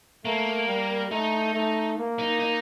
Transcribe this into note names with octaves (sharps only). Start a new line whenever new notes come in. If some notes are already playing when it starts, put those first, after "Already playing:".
A3 A#3
G3
A3 D#4
A3
A#3
D#4
D#4